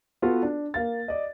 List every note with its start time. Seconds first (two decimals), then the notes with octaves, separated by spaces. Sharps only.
0.22 B3 F4 F#4 A4 B4
0.43 D4
0.74 A#3 F5 A6
1.08 D5 D#5